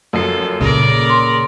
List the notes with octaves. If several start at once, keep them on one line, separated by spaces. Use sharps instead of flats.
F#2 F3 A4 C7
A#2 C#3 A#3 A#4 D5
C6